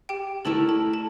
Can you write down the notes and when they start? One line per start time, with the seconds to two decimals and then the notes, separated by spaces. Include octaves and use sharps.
0.09 G4 G5
0.45 A3 E4 A4 A#4 D5 A5
0.69 A4 A5
0.93 A4 A5